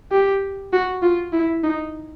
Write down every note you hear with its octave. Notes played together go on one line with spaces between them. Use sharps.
G4
F#4
F4
E4
D#4